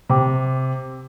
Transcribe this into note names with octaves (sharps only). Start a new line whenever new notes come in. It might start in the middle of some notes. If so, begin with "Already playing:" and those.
C3 C5 G5 D6